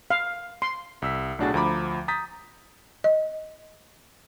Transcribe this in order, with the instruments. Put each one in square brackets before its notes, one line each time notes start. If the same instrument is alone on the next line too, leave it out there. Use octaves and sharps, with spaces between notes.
[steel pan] F5
C6
[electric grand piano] C2 E6 B6
B1 A2 D4 F#4 G#4 A6
D2 F3 A#5 B5 D6
A#5 D#6 G6 A6 B6
[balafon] D#5